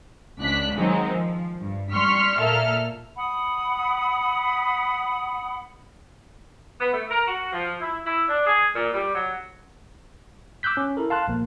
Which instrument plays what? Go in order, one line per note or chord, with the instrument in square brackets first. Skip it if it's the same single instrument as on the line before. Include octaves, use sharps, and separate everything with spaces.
[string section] C#2 D4 F#6 B6
D#3 F#3 G#3 C4 D#4
F3
G2
G3 C6 C#6 F6 B6
A#2 A#3 A4 E5 F6
[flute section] F#5 B5 D#6
[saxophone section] B3
A3
A#4
F#4
F3
E4
E4
D4
G#4
A#2
G3
F#3
[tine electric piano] D6 E6 F#6 G6 B6
C#4
E4 A4 A#4
F5 A5 C6 F#6
A#1 A#3